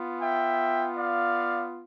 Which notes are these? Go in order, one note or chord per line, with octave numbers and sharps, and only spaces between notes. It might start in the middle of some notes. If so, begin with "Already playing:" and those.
Already playing: B3 F4
E5 G5
D5 F5